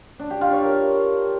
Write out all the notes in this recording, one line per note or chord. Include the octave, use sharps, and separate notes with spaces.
D4
G4
F4
C#5
A#4